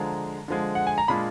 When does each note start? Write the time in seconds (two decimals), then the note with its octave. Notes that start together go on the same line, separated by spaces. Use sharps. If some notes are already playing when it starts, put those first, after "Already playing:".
Already playing: D3 F3 G#3 A#5
0.48 D3 F3 G#3
0.75 F#5
0.87 G#5
0.98 A#5
1.08 A#2 G#3 D4 F4 B5